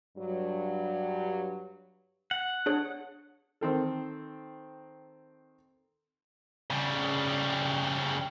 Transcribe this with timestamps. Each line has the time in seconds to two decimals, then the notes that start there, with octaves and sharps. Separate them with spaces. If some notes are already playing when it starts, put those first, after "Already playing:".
0.17 G2 F#3
2.31 F#5
2.66 D4 G#4 C#5
3.61 D#3 C4 A4
6.70 C#3 G3